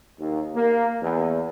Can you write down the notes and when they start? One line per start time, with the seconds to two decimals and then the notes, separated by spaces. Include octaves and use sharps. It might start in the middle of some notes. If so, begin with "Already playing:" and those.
0.18 D#2
0.54 A#3
1.02 E2